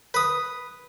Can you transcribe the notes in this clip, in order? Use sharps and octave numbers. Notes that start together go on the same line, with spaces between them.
B4 D#6